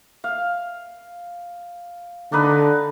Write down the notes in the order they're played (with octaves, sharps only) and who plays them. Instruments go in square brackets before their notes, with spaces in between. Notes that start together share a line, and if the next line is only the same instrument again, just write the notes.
[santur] F5
[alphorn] D3 [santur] D4 D#4 B4